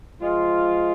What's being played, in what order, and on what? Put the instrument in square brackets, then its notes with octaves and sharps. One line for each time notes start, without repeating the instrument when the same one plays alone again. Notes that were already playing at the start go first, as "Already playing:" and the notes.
[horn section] F3 G#3 F4